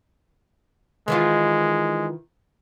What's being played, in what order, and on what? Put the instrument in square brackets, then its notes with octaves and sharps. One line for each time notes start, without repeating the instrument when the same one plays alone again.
[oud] D#3 E3 F4 [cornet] G#3